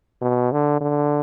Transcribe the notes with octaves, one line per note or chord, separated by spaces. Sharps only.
B2
D3
D3